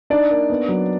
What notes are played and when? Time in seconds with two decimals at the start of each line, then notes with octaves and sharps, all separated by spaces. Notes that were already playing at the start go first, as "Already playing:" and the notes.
0.10 D4 D#4 D5
0.31 A#3
0.50 B3
0.69 F#3